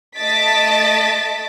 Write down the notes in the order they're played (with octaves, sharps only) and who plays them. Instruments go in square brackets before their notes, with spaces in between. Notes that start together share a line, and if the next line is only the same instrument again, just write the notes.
[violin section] A3 D#5 A5 A6 B6 D7